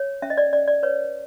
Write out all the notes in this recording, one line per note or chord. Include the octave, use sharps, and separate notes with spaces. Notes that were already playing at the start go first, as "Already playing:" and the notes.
Already playing: C#5
C#4 E5
D#5
D5
C#4 D5
D5
B4 C#5